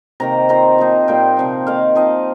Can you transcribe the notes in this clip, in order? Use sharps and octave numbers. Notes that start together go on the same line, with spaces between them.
C3 D#3 A#3 A#5
D#3 C4 F4 A#5
F3 A#3 D#4
A#2 G3 A#3 F4 G5
C3 F3 A#3
D#3 A#3 D#4 F5
F3 C4 D#4 D#5